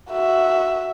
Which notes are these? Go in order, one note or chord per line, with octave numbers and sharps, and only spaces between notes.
F#4 E5